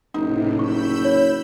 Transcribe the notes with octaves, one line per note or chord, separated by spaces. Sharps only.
F#1 A2 C3 D#4
B5 C#6 E6 G6
C#5